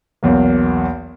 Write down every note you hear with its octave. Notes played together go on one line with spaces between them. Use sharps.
B1 E2 A#3